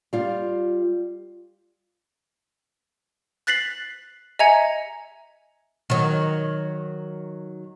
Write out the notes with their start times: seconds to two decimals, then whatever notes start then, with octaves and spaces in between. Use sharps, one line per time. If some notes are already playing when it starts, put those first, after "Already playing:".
0.13 G3 F4
3.47 F#6 A6 B6 C7 F#7
4.39 D#5 E5 G#5 A#5 G#6 C#7
5.90 D#3 F#3